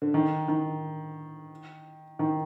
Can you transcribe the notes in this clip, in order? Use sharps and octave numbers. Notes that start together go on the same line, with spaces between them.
D3
D#3
D#3
D#3